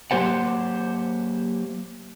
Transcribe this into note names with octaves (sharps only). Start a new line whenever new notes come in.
F#3 A#3 G4 C5 F#5